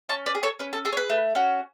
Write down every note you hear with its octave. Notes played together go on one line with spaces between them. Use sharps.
C#4 A5 C#6
B4 D5
G#4
A4 C#5
C#4 B4
A4
G#4 A4
C#5
B4
A3
C#4 F#4